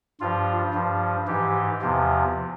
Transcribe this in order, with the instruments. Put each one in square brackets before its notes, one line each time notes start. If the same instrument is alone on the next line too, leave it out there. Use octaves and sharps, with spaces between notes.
[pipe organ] G2 F3 F4
G2 F3
G#2 E3 G4
E2 C3 F3